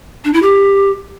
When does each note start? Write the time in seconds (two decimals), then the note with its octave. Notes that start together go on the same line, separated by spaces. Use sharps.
0.25 D4
0.33 E4
0.42 G4